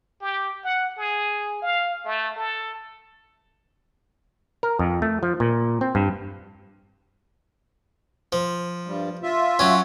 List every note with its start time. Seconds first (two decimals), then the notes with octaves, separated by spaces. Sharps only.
0.21 G4
0.64 F#5
0.98 G#4
1.62 F5
2.05 A3
2.36 A4
4.63 A#4
4.79 F2
5.02 A3
5.23 F3
5.40 A#2
5.81 C4
5.95 G2
8.32 F3
8.87 G2 G3
9.23 F4 E5
9.59 F#3 C#4